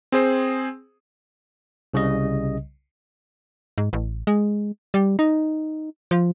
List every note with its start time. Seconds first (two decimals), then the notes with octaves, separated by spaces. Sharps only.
0.12 C4 G#4 C5
1.94 C2 C#3 G3 D#5
3.78 G#2
3.93 A1
4.27 G#3
4.94 G3
5.19 D#4
6.11 F3